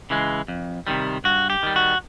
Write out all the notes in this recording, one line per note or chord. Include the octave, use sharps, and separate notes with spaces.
C#3 E3 G#3
F2
C3 D#3 G3
G2 F#4
G4
D#3 G3
F#4